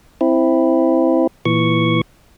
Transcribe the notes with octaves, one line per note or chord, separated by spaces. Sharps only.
C4 E4
A#2 E3 C#6